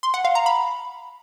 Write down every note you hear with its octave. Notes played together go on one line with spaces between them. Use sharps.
C6
F#5
F5
A#5
B5